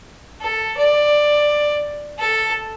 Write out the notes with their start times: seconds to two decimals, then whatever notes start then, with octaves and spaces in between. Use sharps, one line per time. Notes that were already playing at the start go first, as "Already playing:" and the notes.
0.41 A4
0.77 D5
2.19 A4